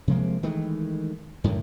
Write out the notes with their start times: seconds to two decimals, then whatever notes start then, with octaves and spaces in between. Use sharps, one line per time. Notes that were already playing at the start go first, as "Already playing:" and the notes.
0.07 C3 F3 G#3 A#3
0.43 D#3 E3 G#3 A3
1.44 F#2 A2 D3 D#3